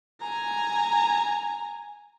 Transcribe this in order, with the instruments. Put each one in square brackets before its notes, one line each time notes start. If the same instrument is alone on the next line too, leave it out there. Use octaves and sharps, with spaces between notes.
[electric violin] G#5 A#5